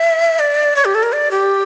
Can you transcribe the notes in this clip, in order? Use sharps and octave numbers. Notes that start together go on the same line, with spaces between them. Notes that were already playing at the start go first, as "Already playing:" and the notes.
Already playing: E5
D5
C#5
G4
A4
A#4
D5
G4